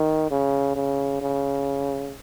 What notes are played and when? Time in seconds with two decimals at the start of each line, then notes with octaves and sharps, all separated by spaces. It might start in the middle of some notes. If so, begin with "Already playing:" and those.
Already playing: D#3
0.31 C#3
0.76 C#3
1.21 C#3